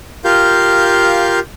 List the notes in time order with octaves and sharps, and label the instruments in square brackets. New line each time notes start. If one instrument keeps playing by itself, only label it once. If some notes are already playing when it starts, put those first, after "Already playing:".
[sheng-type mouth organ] F4 G4 A#4 F5 G6